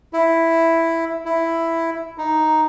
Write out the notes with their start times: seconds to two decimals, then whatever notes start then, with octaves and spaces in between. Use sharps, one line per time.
0.13 E4
1.26 E4
2.18 D#4